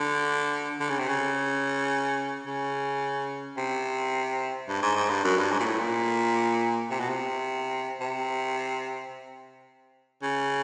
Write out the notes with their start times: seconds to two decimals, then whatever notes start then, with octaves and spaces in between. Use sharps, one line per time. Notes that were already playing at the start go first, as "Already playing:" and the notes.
Already playing: D3
0.80 D3
0.90 C#3
0.99 C3
1.08 C#3
2.46 C#3
3.57 C3
4.69 G2
4.82 G#2
4.96 G#2
5.10 G2
5.24 F#2
5.38 G2
5.52 G#2
5.60 A#2
5.65 A2
5.79 A#2
6.90 C3
7.00 B2
7.09 C3
8.00 C3
10.23 C#3